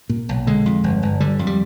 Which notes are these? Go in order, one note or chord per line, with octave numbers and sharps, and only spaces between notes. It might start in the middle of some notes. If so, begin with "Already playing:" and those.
A#2
B1
D3 G#3
F2
G1
G1
D3 G3
F2
G3